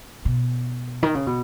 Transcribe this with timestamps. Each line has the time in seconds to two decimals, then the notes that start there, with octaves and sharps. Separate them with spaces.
0.25 B2
1.03 D#3
1.15 C#3
1.27 B2